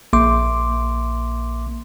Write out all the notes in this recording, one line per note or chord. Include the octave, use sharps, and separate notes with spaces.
A#1 A#3 E5 C6 D6